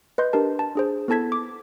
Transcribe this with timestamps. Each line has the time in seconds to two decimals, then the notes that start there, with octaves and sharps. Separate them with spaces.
0.18 B4 D#5 C6 G6
0.33 D4 G4 A#4 A5
0.59 A5
0.75 D4 G#4 C5
1.08 B3 E4 A4 A5 G#6 B6
1.32 D6